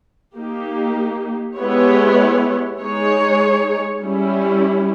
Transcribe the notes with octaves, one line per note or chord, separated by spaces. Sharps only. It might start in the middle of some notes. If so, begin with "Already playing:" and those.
A#3 D#4 G4
G#3 B3 E4 G4 C#5
G#3 D#4 G#4 C#5
G3 C#4 E4